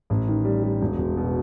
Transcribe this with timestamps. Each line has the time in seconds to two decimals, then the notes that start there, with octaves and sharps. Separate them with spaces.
0.10 A1
0.28 D#3
0.45 G3
0.63 G3
0.81 E1
0.98 E1
1.17 B2